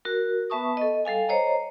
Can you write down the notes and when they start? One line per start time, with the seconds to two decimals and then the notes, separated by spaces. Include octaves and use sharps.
0.05 F#4 A#4
0.50 B3 B4 E5 A5 C#6 D#6
0.77 A4 D#5
1.05 G3 A4 F5 G#5
1.29 C5 C#5 D#5 A#5